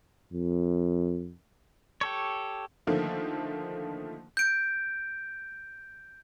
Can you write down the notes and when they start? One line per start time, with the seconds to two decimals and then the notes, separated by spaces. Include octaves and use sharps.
0.33 F2
2.01 G4 A4 C#5
2.87 D3 D#3 F3 A3 A#3
4.37 G6 D7